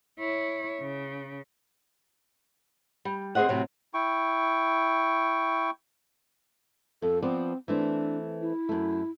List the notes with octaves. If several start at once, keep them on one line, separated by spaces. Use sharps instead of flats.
E4 C#5
C#3
G3
D#2 C4 G#4 C5 D#5 F#5
A2 C3 F#3
E4 G5 C#6
F2 A4
F3 B3 C4 D5
E3 A3 C4 D4
E4
F#2 A3